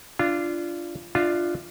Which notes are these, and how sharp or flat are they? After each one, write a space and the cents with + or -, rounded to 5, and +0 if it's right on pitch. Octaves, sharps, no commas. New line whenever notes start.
D4 +0 F4 -20
D4 +20 F4 +0 E5 +0